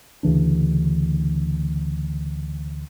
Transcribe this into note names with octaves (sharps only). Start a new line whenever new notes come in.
D2 C#3 E3 D4